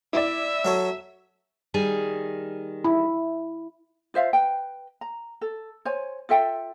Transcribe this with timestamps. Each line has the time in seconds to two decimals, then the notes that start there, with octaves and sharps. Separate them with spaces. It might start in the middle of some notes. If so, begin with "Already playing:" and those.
0.13 E4 D5 E5
0.65 F#3 A4 C#5
1.74 D#3 G3 G#4
2.84 E4
4.14 F4 C5 E5 F5
4.33 B4 G5
5.01 A#5
5.41 A4
5.85 C5 C#5 G#5
6.29 F4 A4 E5 G5